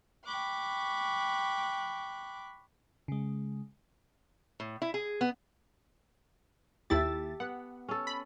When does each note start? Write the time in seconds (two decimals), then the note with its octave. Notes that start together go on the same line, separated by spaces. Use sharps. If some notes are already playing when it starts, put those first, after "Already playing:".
0.25 G5 B5 C#6 D6 F#6
3.08 C#3 G#3
4.60 A2
4.82 E4
4.94 G#4
5.21 B3
6.90 D#2 E4 G4 A4 E5 A6
7.40 B3 F#5
7.89 C#4 A4
8.07 B5